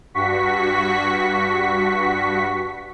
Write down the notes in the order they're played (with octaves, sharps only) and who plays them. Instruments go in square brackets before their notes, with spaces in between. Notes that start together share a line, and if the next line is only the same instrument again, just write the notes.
[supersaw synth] G2 F#4 C#6 B6